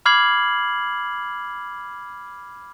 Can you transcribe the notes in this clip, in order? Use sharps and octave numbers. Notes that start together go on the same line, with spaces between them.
B5 D6 F6 G#6 C7 F#7